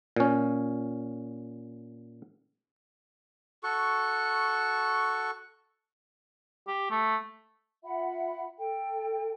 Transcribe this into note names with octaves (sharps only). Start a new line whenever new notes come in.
A#2 C#4
F#4 A4 C#6
G4
A3
F4 E5 F#5 B5
A4 G5